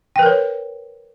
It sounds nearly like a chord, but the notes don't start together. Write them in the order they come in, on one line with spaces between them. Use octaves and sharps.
G5 B4 A#4 C#5